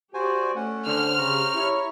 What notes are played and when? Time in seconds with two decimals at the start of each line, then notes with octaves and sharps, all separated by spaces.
0.14 F#4 G4 C5 D5 G#5
0.56 A3 C#4 F#5
0.86 D3 C5 F6
1.18 C#3 G4 C5 A#5 C#6
1.55 E4 C#5